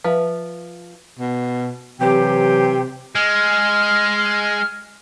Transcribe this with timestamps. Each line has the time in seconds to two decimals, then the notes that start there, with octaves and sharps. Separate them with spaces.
0.05 F3 B4 E5
1.19 B2
2.01 C3 E3 F#3 G4 G5
3.15 G#3 F6